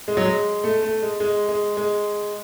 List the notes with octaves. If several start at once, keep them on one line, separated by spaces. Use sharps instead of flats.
G#3
F#3
G#3
A3
A3
G#3
G#3
G#3
G#3